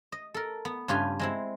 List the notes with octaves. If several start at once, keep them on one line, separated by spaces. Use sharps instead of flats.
D#5
A4 A#4
B3
G2 C#3 F4 G4 B4 G#5
G#3 C4 E4